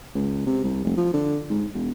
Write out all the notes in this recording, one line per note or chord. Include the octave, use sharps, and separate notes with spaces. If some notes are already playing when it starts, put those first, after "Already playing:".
C#2
C3
C2
F1
F3
D3
G#2
E1